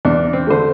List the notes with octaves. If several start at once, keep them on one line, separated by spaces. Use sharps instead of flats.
E2 D4
C4
D3 A3 C5